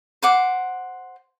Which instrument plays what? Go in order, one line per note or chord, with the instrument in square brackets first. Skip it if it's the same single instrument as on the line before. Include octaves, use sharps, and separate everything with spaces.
[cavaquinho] C5 F#5 D6